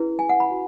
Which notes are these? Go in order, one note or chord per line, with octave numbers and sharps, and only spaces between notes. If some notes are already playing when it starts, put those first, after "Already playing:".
Already playing: C#4 E4 G#4 B4
G#5
F#5
B5
F#4